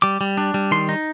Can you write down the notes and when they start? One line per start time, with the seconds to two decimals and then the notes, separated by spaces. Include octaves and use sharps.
0.02 G3 D6
0.21 G3
0.38 D4
0.54 G3
0.71 D#3 C6
0.89 D#4